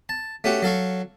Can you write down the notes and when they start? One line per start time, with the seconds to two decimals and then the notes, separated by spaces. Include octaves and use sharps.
0.09 A5
0.44 A3 C#4 F#4 G4
0.62 F#3 A4 F5 C#6